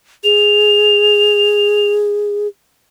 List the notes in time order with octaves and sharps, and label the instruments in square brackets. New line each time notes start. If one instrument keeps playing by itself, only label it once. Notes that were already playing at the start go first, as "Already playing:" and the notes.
[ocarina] G#4 [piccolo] F7